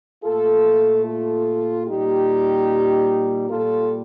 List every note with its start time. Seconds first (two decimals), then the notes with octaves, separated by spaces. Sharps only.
0.24 A#2 A3 F4 A4
1.05 F4 A4
1.86 A#2 G3 D#4 G4
3.50 A#2 G3 F4 A4